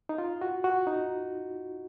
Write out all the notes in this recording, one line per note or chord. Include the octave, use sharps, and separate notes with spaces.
D#4
F4
F#4
F#4
D#4